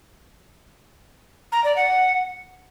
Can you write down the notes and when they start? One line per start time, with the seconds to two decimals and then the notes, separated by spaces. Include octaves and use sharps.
1.52 A#5
1.64 D5
1.76 F#5